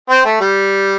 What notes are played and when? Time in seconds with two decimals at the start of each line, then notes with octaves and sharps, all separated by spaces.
0.10 C4
0.25 A3
0.40 G3